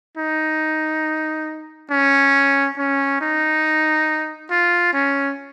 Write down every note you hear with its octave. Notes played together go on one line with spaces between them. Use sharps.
D#4
C#4
C#4
D#4
F4
C#4